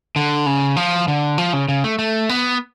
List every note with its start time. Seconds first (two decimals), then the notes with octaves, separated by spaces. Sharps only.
0.16 D3
0.46 C#3
0.76 F3
1.08 D3
1.38 F3
1.53 C#3
1.68 C#3
1.84 A3
1.99 A3
2.29 B3